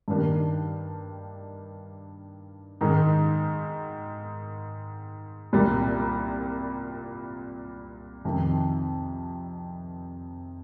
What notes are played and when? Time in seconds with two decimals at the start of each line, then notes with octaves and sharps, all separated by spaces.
0.08 G2 D#3 A#3 D4 G4
2.81 G#2 D#3 G#3
5.53 C2 A#2 G3
8.25 F2 C3 D#3